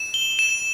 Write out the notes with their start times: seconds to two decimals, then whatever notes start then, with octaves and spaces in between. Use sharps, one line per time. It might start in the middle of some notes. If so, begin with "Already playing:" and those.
Already playing: E7
0.14 G7
0.39 E7